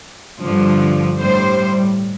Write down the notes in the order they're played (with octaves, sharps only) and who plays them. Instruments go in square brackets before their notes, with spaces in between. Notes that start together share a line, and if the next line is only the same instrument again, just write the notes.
[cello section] G2 D3 F3
A2 G3 C5